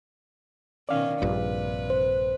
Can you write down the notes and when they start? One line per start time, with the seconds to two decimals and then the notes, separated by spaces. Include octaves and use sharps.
0.89 B2 D#3 C#4 D5 F5
1.22 A#1 G2 C3 B4
1.90 C5